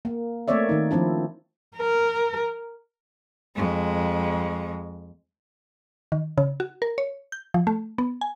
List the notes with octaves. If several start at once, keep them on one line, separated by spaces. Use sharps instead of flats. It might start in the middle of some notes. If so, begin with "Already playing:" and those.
A#3
A3 A#3 C4 C#5 D5 E5
D#3 D#4
F3 C4 D4 E4
A#4
F2 G#3
D#3
C#3
F#4
A#4
C#5
G6
F3
A3
B3
G#5